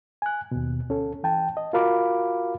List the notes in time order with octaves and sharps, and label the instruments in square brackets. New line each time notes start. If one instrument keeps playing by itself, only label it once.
[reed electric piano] G#5 F#6
D#2 B2
D2 C#4 A4
E3 G5 A5
D#5
F4 F#4 A#4 F5 B5 D6